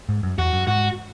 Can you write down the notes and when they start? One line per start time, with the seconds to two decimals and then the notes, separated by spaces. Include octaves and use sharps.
0.09 G#2
0.23 F#2
0.38 E2 F#4
0.53 F#2
0.67 G#2 F#4